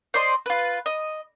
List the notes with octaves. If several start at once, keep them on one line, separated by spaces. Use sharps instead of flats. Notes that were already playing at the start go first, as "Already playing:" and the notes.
C5 D5 D#5 C6
F4 B4
D#5